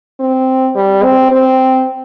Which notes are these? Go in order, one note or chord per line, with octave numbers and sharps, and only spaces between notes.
C4
G3
C4
C4